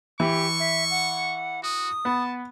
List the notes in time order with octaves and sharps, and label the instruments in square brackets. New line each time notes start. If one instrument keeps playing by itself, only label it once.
[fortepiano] E3 E4 [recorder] G4 [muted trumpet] C#6
[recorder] E5
F#5
[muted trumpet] F#4 [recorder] D#6
[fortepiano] B3 [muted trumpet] A5